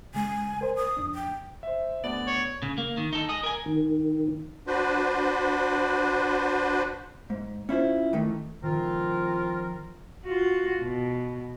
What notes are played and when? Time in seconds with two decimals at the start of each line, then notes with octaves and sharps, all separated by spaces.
0.14 C#3 G#3 G#5
0.61 A#4 C5
0.77 D#6
0.97 F2 D4
1.15 G5
1.63 C5 E5
2.04 D2 B3 D5
2.27 C#5
2.62 C#3
2.78 A#3
2.97 D#3
3.13 D#4 A4
3.29 G#4 D#5
3.43 A#4 G#5
3.66 D#3
4.67 D4 F#4 B4 C5
7.30 G#2
7.69 C#4 E4 F4 C5
8.13 D#3 E3 A3
8.64 D#3 F3 C4 F4 A#4
10.26 F4 F#4
10.81 B2